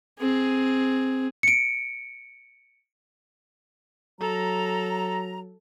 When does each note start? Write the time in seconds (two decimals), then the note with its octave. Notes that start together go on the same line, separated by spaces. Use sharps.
0.19 C4 G#4
1.43 C#7 D7
4.21 F#3 A4 A#5